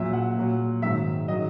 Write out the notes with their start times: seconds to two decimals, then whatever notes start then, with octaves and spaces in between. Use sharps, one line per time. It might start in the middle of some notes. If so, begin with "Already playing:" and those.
Already playing: A#2 F#3 E5
0.13 F#5
0.36 A#2 F#3
0.82 G#2 D#3 F#3 E5
1.28 D#3 F#3 D#5